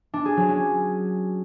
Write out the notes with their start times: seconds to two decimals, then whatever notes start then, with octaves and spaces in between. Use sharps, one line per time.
0.13 D4
0.25 G#4
0.37 F#3
0.49 C#4